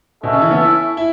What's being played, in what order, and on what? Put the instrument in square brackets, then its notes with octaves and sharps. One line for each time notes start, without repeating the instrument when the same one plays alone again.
[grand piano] B2 [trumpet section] C#4 A4 E5
[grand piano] C#3
E3
B3
E4
E4